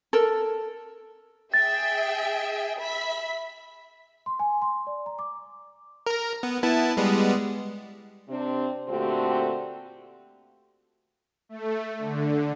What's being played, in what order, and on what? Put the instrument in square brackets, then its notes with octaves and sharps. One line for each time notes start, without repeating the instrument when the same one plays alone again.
[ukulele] A4 A#4
[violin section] G#4 E5 G5 [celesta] A6
[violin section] E5 B5 B6
[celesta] C6
G#5
C6
D5
A#5
D6
[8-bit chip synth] A#4 A#5
B3
B3 E4 A5
G3 G#3 B3
[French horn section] C3 C4 D4
A#2 D3 A3 C4 F#4 G4
[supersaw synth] A3
D3